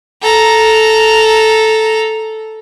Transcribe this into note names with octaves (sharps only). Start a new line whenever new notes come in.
A4 A#5